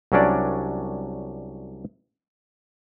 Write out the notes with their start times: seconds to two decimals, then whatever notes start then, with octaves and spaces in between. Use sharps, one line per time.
0.12 C2 F#3 C#4 D4 D5